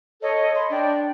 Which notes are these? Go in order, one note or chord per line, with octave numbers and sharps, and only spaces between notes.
A4 C#5 D#5
B5 C6
D4 D5 G5